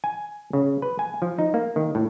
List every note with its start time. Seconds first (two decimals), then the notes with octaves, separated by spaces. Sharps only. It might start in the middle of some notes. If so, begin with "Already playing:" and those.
0.04 G#5
0.53 C#3
0.82 B4
0.99 G#5
1.22 F3
1.39 D#4
1.54 A#3
1.76 D#3
1.95 A2